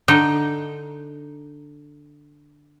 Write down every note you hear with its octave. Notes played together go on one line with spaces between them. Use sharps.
D3 D#4